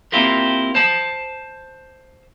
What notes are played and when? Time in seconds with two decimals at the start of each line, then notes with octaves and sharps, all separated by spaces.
0.12 A#3 C4 E4 F4 G4 A#4
0.75 C5 A5